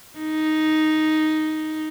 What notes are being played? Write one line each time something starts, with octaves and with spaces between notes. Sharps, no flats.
D#4